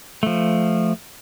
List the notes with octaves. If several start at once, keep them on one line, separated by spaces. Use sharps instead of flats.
F3 A3